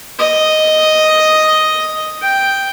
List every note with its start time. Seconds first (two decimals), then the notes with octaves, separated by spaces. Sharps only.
0.19 D#5
2.22 G5